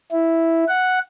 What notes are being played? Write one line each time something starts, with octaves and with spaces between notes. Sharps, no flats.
E4
F#5